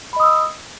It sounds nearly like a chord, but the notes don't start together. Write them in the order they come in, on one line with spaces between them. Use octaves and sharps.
B5 D#5 D#6 E6